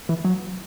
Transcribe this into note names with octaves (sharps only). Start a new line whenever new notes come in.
E3
F#3